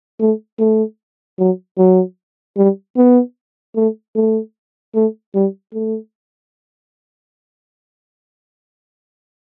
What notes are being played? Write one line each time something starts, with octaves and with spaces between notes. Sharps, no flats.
A3
A3
F#3
F#3
G3
B3
A3
A3
A3
G3
A3